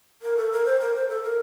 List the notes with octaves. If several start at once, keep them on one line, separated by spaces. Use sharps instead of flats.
A#4
A4
A#4
C5
A#4
C5
A4
A#4